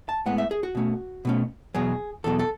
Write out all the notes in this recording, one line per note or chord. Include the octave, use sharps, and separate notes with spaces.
A5
A2 G#3 B3 F#5
E5
G#4
F#4
B2 A3 C#4
B2 A3 C#4
E2 B2 F#3 G#4
E2 B2 F#3 A4
A4